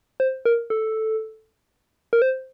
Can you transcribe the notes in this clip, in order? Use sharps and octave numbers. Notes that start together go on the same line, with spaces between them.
C5
A#4
A4
A#4
C5